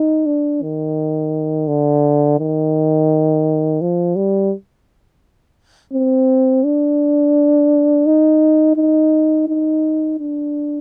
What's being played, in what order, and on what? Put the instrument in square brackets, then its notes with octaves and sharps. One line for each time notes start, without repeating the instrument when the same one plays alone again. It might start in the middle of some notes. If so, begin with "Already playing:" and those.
Already playing: [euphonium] D#4
D4
D#3
D3
D#3
F3
G3
C4
D4
D#4
D#4
D#4
D4